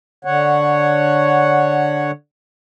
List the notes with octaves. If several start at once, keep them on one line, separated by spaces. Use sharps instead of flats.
D3 C#5 F#5